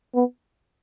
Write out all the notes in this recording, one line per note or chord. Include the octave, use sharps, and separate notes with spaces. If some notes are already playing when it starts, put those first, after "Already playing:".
B3